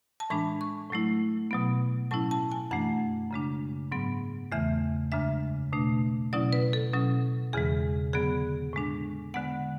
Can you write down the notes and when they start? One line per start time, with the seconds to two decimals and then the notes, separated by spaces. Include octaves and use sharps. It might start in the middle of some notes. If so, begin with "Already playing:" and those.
0.20 A5
0.30 A2 E3 G#3 D4 B5
0.61 C#6
0.91 A2 F#3 A3 E4
1.51 B2 F#3 B3
2.11 A2 F#3 C#4 E4 A5
2.31 A5
2.52 G#5
2.71 F#2 E3 A3 D4 F#5
3.31 F#2 C#3 G#3 D4
3.92 G#2 F#3 B3
4.52 E2 C#3 E3 A3 E5
5.12 F#2 C#3 G#3 D4 E5
5.73 B2 A3 D4
6.33 B2 F#3 C#4 E4 D5
6.53 B4
6.73 A4
6.93 B2 F#3 C#4
7.53 E2 C#3 E3 G#3 G#4
8.13 D3 F#3 B3 G#4
8.73 A2 G#3 D4
9.34 D3 G#3 B3 F#5